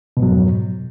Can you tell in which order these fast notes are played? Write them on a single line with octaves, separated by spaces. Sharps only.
B2 G#2 F#3 F2